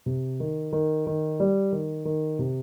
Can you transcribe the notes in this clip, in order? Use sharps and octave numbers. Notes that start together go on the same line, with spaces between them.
C3
D#3
D#3
D#3
G3
D#3
D#3
C3